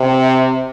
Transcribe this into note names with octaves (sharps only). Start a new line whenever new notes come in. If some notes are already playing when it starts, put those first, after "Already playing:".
Already playing: C3